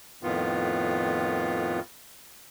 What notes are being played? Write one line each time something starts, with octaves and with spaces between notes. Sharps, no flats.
F2 A2 D#3 B3 F4